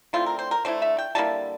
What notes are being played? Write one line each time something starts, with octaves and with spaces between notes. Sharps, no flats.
D3 A3 C4 E4 F4
A#4
C5
A#4
D3 A3 C4 E4 C5
E5
G5
D3 G3 A#3 E4 A5